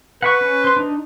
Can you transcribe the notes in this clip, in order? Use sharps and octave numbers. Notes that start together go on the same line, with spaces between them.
B4 F#5 B5 C#6
C#4
C5 C6
D4 D#4